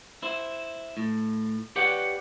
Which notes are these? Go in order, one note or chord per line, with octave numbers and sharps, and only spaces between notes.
E4 C5
A2
G4 B4 C#5 D5 F#5 G5